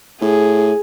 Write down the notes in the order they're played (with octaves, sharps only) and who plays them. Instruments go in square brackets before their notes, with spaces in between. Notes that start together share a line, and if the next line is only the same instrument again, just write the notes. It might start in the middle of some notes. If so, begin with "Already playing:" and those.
[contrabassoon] A2 [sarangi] G#4